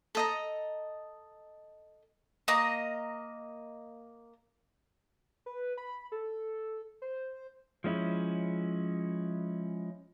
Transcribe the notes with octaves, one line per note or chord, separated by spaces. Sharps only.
A4 D#5 A#5
A#3 D#5 A#5
B4
B5
A4
C5
F3 G#3 C#4 E4